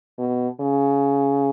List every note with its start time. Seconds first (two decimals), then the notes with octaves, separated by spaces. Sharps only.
0.19 B2
0.60 C#3